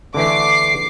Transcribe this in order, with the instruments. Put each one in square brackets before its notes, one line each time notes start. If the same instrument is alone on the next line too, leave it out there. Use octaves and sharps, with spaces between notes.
[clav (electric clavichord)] D3 E3 A3 [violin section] D6 C7